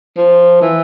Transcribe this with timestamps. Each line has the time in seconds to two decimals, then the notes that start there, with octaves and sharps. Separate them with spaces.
0.17 F3
0.61 E3